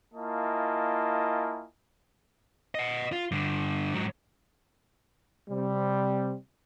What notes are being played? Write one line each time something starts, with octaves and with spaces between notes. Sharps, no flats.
A#3 E4 F4 D#5 G#5 A5
D#5 F#5
F4
G2 D3
G#2 F#3
C3 G3 C4